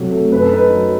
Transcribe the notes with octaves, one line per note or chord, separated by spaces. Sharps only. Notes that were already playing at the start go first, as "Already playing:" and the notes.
Already playing: C3 F#3 A3
A3
F#2 B4
A4
D#4 B4
F#3